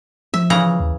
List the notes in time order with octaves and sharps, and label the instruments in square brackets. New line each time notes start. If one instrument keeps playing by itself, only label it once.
[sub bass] F3 [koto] E5
[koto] C#3 E3 A#5
[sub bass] D#2